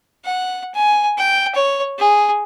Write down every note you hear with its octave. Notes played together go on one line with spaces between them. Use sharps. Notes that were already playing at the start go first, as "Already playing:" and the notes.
F#5
G#5
G5
C#5
G#4